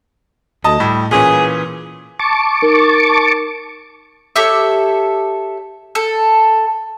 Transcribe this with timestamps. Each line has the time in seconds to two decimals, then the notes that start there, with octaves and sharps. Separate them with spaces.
0.64 D2 D#5 A5 D#6
0.80 A2 G3
1.11 A#2 E3 C#4 G#4
2.20 A5 C#6 D6
2.62 D#4 A#4
4.36 G4 A4 C#5 E5
5.95 A4